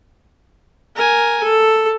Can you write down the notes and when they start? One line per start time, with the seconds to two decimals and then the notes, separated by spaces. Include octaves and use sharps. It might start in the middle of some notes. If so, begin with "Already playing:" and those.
0.96 A#4 G#5
1.44 A4